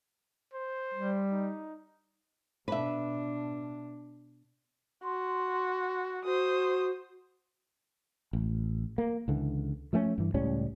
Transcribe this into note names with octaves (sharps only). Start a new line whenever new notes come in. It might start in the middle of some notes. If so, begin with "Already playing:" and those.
C5
G3
D#4
B2 D4 B4 E5
F#4 C6
F#4 C5 D#6
A1
A#3
C#2 D3 E3
F3 A3 B3 C#4
G2 E3
C#2 A2 G3 C#4